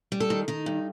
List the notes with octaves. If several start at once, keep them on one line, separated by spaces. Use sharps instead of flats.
G3
A4
D#3
D#3 D#4
G2